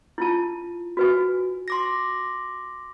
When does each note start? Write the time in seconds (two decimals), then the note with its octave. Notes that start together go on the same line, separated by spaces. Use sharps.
0.18 E4 F4 A5
0.97 F#4 B4 G#5
1.68 C6 D6 A#6